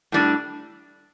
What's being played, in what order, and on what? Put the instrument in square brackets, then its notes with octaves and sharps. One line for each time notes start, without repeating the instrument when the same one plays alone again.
[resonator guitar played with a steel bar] A2 G3 D4